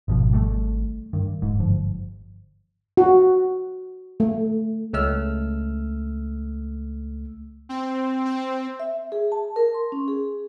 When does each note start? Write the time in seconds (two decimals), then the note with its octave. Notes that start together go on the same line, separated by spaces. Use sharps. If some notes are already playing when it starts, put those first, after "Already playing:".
0.08 G#1 G#2 B2 F3
0.33 G3 A3
1.13 G2 D#3
1.42 D#1 G#2
1.60 G1 F3
2.97 F#4
4.20 A3
4.93 C#2 A3 E6 F6
7.69 C4
8.25 C4
8.80 E5
9.12 G#4
9.32 A5
9.56 A#4
9.74 C6
9.92 C#4
10.08 G#4